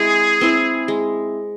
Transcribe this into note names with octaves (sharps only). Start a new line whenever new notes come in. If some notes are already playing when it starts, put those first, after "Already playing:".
Already playing: G#3 C4 E4 G#4
C4 E4
G#3